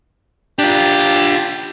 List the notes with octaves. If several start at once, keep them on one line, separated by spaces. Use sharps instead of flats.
D4 F4 G4